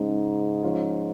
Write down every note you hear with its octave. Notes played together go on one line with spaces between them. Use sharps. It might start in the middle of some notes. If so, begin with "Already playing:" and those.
Already playing: G#2 C#3 G#3 D#4 G#4
F3 C#4 F4 G#4